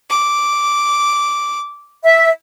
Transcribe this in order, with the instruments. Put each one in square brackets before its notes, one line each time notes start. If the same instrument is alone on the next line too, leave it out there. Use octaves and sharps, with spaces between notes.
[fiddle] D6
[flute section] E5